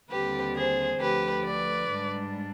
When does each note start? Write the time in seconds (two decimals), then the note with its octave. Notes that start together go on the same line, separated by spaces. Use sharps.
0.10 D#2 D3 G3 C4 G4 B4
0.55 G#4 C5
0.99 D2 D3 F3 G4 B4
1.44 B4 D5
1.89 G#2 G3 D4